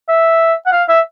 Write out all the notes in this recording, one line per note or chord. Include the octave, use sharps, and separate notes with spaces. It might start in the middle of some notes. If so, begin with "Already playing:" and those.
E5
F#5
F5
E5